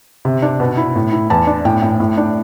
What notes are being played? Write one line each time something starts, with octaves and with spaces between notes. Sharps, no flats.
C3
D4
B2
E4
A2
E4
E2 A5
D4
A2 G5
A2
A2
D4